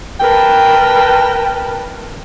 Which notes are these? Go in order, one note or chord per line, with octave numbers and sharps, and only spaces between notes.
A#4 B4 G5 A5